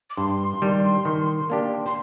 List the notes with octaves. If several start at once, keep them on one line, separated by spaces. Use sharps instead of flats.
D6
G2 C6
D#3 G3 D4
D#3
A#3 D4 G4
C6